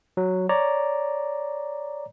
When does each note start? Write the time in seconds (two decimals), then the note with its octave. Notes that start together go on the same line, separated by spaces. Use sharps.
0.17 F#3
0.49 C#5 D5 A#5